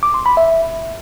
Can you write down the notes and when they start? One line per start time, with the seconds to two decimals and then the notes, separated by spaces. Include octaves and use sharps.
0.03 D6
0.14 C6
0.26 B5
0.37 E5